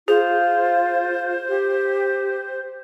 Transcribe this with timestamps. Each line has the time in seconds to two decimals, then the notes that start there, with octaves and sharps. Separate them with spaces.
0.08 F4 G#4 C5
1.49 G4